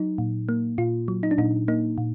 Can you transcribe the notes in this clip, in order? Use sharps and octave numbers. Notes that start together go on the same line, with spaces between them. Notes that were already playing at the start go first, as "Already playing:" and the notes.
Already playing: F#3 D#4
A#2
A#3
A#2 F4
F#3
D#4
D4
A#2 D#4
A#3 D#4
A#2